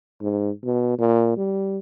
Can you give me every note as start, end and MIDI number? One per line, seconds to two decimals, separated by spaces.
0.22 0.50 44
0.65 0.94 47
0.98 1.34 46
1.37 1.79 55